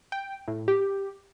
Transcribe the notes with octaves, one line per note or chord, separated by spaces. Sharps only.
G5
A2
G4